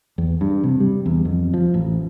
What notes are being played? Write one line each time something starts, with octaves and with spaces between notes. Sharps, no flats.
E2
G2
C3
G3
E2
F2
F3
A1